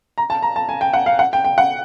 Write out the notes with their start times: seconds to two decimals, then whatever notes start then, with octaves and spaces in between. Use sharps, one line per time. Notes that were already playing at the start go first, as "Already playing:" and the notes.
0.18 A#5
0.30 A5
0.43 A#5
0.56 A5
0.69 G#5
0.81 G5
0.94 F#5
1.06 F5
1.19 F#5
1.33 G5
1.45 G5
1.58 F#5